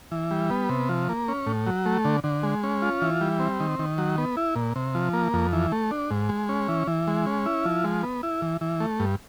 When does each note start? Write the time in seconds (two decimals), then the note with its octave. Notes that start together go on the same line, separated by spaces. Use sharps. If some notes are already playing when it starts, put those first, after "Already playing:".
0.11 E3
0.31 G3
0.50 B3
0.69 C3
0.89 F3
1.09 A#3
1.28 C#4
1.46 A2
1.67 F#3
1.86 A3
2.05 D3
2.24 D3
2.43 G#3
2.64 C#4
2.82 F4
3.02 E3
3.21 G3
3.40 C4
3.60 D#3
3.79 D#3
3.98 F#3
4.18 B3
4.37 E4
4.55 A#2
4.76 C3
4.95 F3
5.13 A#3
5.33 F2
5.53 E3
5.72 A3
5.91 D4
6.11 G#2
6.29 G#3
6.49 C#4
6.68 E3
6.87 E3
7.07 G#3
7.26 C#4
7.46 E4
7.65 F3
7.84 G#3
8.03 B3
8.23 E4
8.42 E3
8.61 E3
8.80 A3
9.00 G2